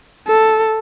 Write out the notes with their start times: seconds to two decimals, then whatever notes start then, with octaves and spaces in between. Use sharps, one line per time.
0.28 A4